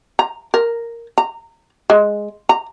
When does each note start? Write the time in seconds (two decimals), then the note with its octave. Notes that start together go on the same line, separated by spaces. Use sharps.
0.19 A#5
0.54 A#4
1.18 A#5
1.90 G#3
2.49 A#5